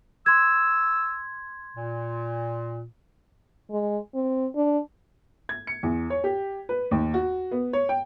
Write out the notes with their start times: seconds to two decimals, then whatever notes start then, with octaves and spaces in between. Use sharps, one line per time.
0.26 C6 E6 G#6
1.76 A#2
3.70 G#3
4.14 C4
4.56 D4
5.49 G#6
5.67 C#7
5.83 E2
6.10 C#5
6.24 G4
6.69 B4
6.91 D#2
7.14 F#4
7.51 B3
7.73 C#5
7.89 G5